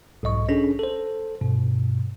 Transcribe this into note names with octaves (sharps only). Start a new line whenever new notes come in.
B1 G#2 D#5 C#6
C#4 D4 G#4 A4
A4 C5
G2 B2